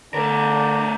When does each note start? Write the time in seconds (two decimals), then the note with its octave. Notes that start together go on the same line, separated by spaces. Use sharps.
0.14 D3 A3 D4 A#4